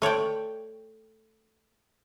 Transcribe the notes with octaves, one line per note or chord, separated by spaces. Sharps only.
A3 C#5 D5 G5